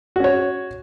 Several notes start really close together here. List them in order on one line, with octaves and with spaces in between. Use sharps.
F#4 C#4 C#5